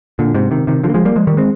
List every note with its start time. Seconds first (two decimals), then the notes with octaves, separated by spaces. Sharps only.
0.19 A#2 D3
0.34 G#2 C3
0.51 C3 D#3
0.67 C3 D#3
0.84 D3 F3
0.89 A#3
0.94 F3 G#3
1.05 G3 A#3
1.16 F3 G#3
1.27 D#3 G3
1.37 G#3 C4